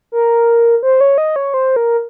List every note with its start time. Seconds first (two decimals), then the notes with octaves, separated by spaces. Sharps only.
0.12 A#4
0.83 C5
1.01 C#5
1.18 D#5
1.36 C#5
1.54 C5
1.76 A#4